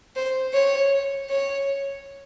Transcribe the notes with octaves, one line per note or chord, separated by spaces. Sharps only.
C5
C#5
C#5